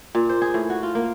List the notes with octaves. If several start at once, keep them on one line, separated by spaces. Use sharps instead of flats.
A#2
C5
G#4
A2
F#4
F4
A#3